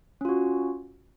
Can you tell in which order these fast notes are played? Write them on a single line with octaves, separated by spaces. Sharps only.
C#4 F4 F#4